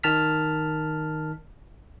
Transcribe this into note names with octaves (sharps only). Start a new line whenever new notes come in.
D#3 A5 F6 B6